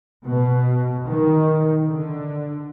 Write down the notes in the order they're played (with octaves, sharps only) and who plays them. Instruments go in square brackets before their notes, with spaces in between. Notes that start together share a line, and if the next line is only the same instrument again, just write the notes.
[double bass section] B2
D#3
D3